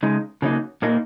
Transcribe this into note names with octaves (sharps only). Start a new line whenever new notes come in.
C#3 G#3 D#4
C#3 F#3 A#3 D#4
A#2 A#3 D#4